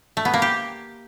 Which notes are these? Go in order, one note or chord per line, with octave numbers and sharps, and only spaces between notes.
A3
B3
A#3
G4